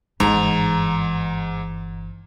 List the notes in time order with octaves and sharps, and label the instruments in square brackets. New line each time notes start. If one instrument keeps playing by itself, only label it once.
[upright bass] G1 E3 [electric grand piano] G#2 [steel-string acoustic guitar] A#5